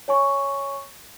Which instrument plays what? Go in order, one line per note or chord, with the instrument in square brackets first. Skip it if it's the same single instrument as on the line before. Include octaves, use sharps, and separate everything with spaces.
[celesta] C#5 G#5 C#6